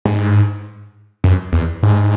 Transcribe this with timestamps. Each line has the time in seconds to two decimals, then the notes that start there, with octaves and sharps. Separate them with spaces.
0.05 G#2
1.24 F#2
1.53 E2
1.83 G#2